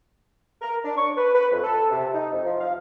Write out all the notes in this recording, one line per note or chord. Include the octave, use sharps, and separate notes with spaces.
A#4
D4
C#6
B4
B4
F2
A4
C3
D#4
F2
F3
F5